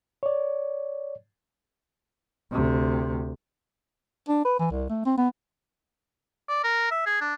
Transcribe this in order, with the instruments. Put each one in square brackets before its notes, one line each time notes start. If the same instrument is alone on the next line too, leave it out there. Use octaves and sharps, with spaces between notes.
[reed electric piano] C#5 D5
[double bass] D2 C3
[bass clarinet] D4
B4
E3
C2
A3
C4
B3
[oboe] D5
A#4
E5
G#4
D4